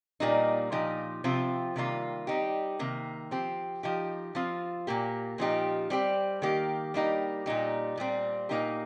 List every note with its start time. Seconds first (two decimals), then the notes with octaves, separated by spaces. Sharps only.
0.20 A#2 G3 A#3 D#4
0.72 A#2 F3 D#4 G4
1.24 C3 F3 C4 F4
1.76 C3 D#3 G3 A#3 F4
2.27 G3 C4 D#4 G4
2.79 C3 D#3 A#3
3.31 F3 C4 G4
3.83 F3 D#4 G4
4.35 F3 C4 F4
4.87 A#2 A#3 G4
5.38 A#2 F3 D#4 G4
5.90 G3 C4 G4
6.42 D#3 A#3 G4
6.94 G3 A#3 D#4 G4
7.46 A#2 G3 D#4 G4
7.97 A#2 G3 C4
8.49 A#2 A#3 D#4 G4